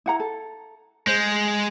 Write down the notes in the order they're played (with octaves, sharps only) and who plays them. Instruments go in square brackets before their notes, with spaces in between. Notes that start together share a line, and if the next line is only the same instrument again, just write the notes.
[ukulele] E4 F#5 A#5
A4
[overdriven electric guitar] G#3 [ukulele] C5